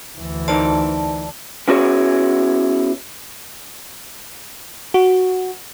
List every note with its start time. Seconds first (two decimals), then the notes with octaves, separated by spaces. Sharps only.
0.18 D2 E3
0.48 D#4 A#4 C5 D5 A5
1.68 B3 C#4 E4 F#4 G#4 C#5
4.94 F#4